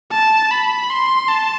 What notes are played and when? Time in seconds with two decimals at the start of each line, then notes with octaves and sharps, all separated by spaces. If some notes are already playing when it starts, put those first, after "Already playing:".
0.11 A5
0.51 B5
0.90 C6
1.29 A5